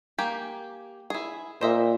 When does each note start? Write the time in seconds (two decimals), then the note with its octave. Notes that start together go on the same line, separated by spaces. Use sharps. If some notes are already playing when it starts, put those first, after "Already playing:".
0.18 A#3 G4 G#5
1.10 E4 G#4
1.61 A#2 C5 D#5 E5